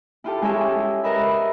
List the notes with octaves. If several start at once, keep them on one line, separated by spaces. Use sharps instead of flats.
E4 F4 G4 A4
G#3 C#4 E4 G4 A4 E5
A#4 B4 D#5 E5 B5